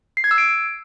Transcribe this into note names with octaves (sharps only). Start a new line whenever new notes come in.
C7
G#6
E6
D7